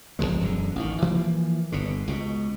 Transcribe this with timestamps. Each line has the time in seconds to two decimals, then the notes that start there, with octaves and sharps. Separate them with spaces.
0.19 F1 F2 F3 G#3
0.40 E1 F#2 D3
0.76 A1 D#3
1.02 E3 F3 A#3
1.72 G1 B2 D3
2.08 C#2 B2